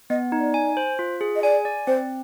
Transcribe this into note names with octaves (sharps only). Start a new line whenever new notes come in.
B3 D#5
D#4
D5
G#5
C5
F4
G#4
D#5
D5 G#5
D5
C4 C5